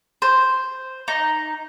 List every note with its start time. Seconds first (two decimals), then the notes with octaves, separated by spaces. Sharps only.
0.22 C5
1.08 D#4